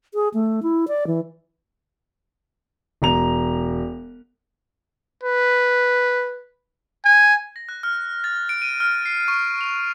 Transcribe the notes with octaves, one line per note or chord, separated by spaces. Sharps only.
G#4
A3
E4
D5
E3
E1 A#5 F7
B4
G#5
A#6
F#6
F6
A6
D7
D#7
F6
C7
C#6
F7